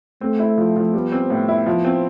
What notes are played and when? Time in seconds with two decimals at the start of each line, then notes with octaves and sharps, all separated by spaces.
0.21 A3 C4
0.39 E4
0.58 F3
0.76 F3
0.93 G3 B3
1.12 C4
1.30 A2
1.48 E4
1.66 F3
1.85 C4